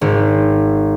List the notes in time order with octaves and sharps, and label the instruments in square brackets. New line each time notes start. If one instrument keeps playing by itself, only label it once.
[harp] G#1